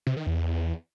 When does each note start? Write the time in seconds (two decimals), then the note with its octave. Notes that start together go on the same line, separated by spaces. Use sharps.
0.07 C3
0.17 D#3
0.27 E2